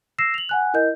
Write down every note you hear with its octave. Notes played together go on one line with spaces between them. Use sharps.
E6 A#6 C7 E7
F7 F#7
F#5 G#5 F#6
E4 A#4 D#5 G6